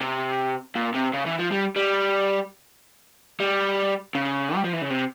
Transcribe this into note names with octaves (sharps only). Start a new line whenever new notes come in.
C3
A#2
C3
C#3
E3
F3
G3
G3
G3
C#3
G3
F3
E3
C#3
C3